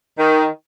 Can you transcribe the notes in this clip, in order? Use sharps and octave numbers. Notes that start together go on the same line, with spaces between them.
D#3